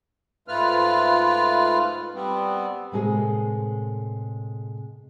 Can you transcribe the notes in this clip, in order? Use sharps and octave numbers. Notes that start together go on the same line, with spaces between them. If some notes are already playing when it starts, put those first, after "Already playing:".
G#2 A3 F4 B4 F6
G3 B3 C4
A2 C3 G#3 A#3 G#4